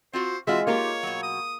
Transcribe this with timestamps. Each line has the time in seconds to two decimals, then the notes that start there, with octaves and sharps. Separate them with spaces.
0.13 C4 F4 F#4 C5
0.47 E3 G#3 C4 F4 F#4 E5
0.67 A#3 D#4 F4 G4 C#5
1.03 B2 F#3
1.23 D#6